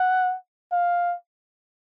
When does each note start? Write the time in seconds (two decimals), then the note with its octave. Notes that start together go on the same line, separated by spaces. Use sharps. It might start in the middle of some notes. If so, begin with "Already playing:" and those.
Already playing: F#5
0.72 F5